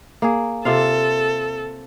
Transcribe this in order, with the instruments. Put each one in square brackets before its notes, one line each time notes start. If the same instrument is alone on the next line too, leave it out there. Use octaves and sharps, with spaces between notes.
[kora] A#3 G#4
[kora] C3 F4 F5 [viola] A4